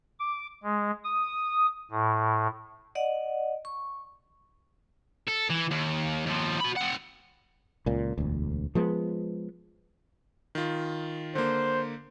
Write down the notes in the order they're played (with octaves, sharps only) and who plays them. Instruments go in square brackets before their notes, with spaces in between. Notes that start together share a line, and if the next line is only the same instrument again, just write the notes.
[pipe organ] D6
G#3
D#6
A2
[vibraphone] D5 D#5 F#5
C#6
[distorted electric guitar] A4
E3
D#2
D#2 F3
F#4 B5
C4 F#5
[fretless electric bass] C#2 A#2
E1 D2
F3 G#3 B3
[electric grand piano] D#3 F4
[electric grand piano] D3 A#3 [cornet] C5